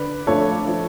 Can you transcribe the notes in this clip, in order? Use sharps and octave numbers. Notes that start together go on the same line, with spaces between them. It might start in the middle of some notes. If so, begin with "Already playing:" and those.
Already playing: D3 B4 D5
F3 A3 D4 F4 A4 C#5
F3